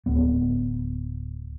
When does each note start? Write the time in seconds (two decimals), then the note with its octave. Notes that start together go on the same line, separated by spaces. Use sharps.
0.06 D1 B3